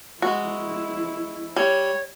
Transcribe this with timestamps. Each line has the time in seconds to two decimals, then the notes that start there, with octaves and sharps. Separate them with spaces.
0.22 G#3 E4 F#4
1.56 G3 C#5